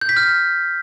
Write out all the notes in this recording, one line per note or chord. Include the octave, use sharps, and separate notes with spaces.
G6
B6
F6